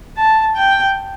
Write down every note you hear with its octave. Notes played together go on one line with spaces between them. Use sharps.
A5
G5